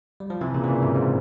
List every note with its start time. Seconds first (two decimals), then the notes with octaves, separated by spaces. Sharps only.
0.20 G3
0.30 F3
0.41 C3 E3
0.54 A#2 C#3
0.63 E3
0.68 A#2 C#3
0.82 G#2 C3
0.95 G#2